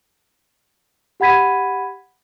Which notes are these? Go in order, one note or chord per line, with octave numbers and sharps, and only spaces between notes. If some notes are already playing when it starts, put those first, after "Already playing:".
G4 F#5 B5 G#6 B6 D#7